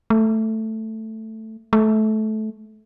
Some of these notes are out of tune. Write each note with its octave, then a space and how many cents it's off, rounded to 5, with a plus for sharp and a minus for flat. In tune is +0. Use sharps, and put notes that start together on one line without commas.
A3 +5
A3 -20